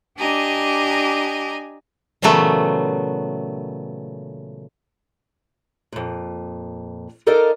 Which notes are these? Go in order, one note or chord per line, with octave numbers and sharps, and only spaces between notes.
D4 G4 D#5 G#5 A#5
A#2 C#3 E3 F#3 A3 B3
F2 A#2
D#4 A4 A#4 D5 D#5 F5